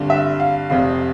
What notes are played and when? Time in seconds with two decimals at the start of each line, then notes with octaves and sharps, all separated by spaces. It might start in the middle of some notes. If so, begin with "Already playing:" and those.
Already playing: G#1 G2 D3
0.10 E5
0.40 F5
0.70 F1 F2 C3 F5